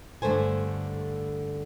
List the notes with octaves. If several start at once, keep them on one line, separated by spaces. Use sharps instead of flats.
G2 D3 A3 A4 C5 G#5